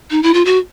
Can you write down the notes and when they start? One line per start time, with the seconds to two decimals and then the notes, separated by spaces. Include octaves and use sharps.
0.11 D#4
0.23 E4
0.34 F4
0.45 F#4